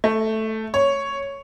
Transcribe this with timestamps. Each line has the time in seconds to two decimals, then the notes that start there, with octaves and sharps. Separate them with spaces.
0.04 A3
0.74 C#5